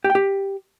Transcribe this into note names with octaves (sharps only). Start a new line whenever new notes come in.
G4
G5
G4